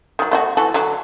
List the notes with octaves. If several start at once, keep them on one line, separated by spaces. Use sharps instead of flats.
D#3 F#3
A3 E4 F#4
E3 F#4 A4
D3 F#3